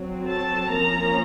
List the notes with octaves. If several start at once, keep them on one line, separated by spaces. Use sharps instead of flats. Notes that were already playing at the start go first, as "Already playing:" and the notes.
Already playing: F#3 C4
A4 A5
F3 A#3 C#4 A#4 A#5